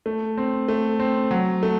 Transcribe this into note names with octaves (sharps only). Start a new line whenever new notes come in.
A3
C4
A3
C4
F#3
A3